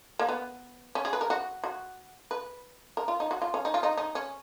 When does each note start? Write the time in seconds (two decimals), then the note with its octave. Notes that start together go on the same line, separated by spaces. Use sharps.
0.19 A#3
0.29 B3
0.95 C#4
1.05 G#4
1.13 B4
1.21 A#4
1.30 F#4
1.64 F#4
2.31 B4
2.97 A#4
3.08 F4
3.20 D#4
3.31 F#4
3.42 F4
3.54 C#4
3.65 D#4
3.74 F4
3.83 D#4
3.97 D#4
4.15 C#4